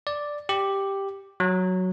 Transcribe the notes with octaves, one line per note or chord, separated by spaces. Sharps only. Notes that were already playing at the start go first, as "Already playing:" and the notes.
D5
G4
F#3